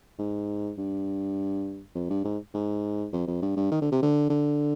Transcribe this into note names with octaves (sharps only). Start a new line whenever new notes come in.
G#2
G2
F2
G2
G#2
G#2
F2
F2
G2
G2
D#3
D3
C3
D3
D3